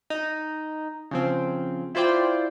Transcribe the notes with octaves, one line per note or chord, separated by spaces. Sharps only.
D#4
C#3 F3 C4
E4 F4 C5 D5 G5